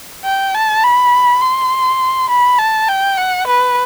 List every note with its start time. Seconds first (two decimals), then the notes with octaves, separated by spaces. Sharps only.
0.25 G5
0.54 A5
0.83 B5
1.42 C6
2.30 B5
2.58 A5
2.88 G5
3.17 F#5
3.47 B4